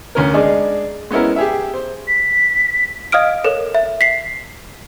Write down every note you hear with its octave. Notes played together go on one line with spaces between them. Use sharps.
D2 C#4 A#4
G#3 D4 D#4 G#4
G#3 B3 C#4 E4 A#4
G4 G#4 E5
C5
B6
D#5 F5 D#6 F6 D7
A4 A#4 C#5
E5
B6 C7